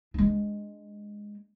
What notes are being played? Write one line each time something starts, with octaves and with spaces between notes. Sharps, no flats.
G#3 D4